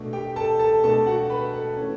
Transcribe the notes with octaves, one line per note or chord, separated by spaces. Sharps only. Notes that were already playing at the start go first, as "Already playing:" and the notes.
Already playing: B2 A3 D4
G4 G5
A4 A5
A4 A5
B2 A3 D4 A4 A5
F#4 F#5
B4 B5
A4 A5
E3 A3 C#4